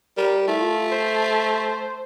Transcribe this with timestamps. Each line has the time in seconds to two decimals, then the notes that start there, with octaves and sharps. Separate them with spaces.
0.17 G3 A#4
0.48 A3 E4
0.60 F4
0.92 C5